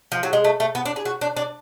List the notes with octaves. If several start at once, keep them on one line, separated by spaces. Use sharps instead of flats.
F3
F#3
G#3
A3
A3
B3
D4
G#4
F#4
D4
D4